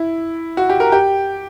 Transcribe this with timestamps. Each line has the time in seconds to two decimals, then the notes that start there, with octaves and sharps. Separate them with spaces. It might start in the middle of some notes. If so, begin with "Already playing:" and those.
Already playing: E4
0.57 F#4
0.69 G4
0.80 A#4
0.92 G4